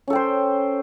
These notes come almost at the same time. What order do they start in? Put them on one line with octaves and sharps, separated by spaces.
C#4 A4 G5 C5